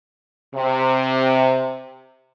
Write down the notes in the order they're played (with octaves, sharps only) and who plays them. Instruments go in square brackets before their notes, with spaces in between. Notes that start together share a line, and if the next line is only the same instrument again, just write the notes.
[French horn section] C3